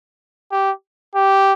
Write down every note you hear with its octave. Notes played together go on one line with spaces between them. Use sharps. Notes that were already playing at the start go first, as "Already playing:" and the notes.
G4
G4